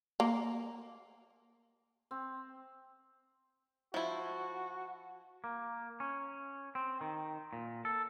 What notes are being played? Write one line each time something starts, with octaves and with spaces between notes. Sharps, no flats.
A#3
C4
F3 E4 F#4
A#3
C#4
C4
D#3
A#2
A4